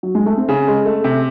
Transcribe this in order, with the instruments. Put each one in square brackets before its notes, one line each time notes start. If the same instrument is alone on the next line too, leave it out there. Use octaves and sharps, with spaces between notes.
[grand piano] F#3
G#3
A3
C4
[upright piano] C#3 [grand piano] C#4
[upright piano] G#3
A3
C3